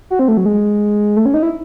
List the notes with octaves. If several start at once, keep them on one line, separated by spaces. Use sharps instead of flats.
F#4
C4
A3
F#3
G#3
A3
C#4
D#4
E4